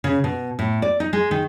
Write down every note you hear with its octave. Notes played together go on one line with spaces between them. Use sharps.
C#3
B2
A2
D5
D#4
G#3
D#3